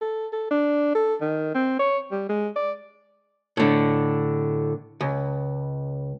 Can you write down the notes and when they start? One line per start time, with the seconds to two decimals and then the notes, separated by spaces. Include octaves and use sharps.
0.01 A4
0.33 A4
0.51 D4
0.95 A4
1.21 D#3
1.55 C4
1.79 C#5
2.11 G3
2.29 G#3
2.56 D5
3.57 A2 D3
5.01 C#2